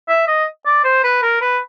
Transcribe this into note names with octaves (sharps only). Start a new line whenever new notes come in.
E5
D#5
D5
C5
B4
A#4
B4